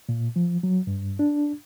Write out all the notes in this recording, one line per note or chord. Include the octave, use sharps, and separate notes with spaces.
A#2
F3
F#3
G2
D4